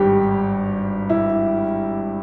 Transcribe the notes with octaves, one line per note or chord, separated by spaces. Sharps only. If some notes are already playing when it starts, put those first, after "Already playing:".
Already playing: G#1 G2 G3 G4
E4